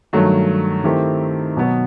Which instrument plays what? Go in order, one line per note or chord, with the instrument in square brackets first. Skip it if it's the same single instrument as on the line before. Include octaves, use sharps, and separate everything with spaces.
[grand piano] G2 D#3 F#3 A3
D#3 A3 C4 E4 G4
B2 F#3 B3